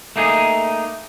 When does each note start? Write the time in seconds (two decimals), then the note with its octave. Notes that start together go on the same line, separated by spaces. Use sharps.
0.16 A3 A#3 D#4 G#4